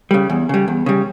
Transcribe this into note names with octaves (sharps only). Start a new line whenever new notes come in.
C#3 G3
E2
C#3 G3
E2
C#3 G3